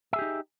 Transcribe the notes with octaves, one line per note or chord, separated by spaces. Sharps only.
D#4 G4 G#4 E5